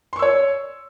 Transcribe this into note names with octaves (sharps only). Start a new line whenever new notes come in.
C#5 C6 C#6 E6